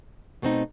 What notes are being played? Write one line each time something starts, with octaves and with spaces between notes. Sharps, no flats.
B2 A3 C4 D#4